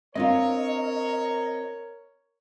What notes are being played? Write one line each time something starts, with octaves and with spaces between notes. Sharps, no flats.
C4 D4 F4 A#4 C#5 D#5